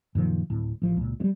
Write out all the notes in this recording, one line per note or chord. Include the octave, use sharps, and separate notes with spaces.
F#2 A#2 D#3 F3
D1 A2
A1 F3
C#2 A#2
G2 G3